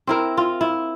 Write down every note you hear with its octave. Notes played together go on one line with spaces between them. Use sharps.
C4 E4 A#4
F4
E4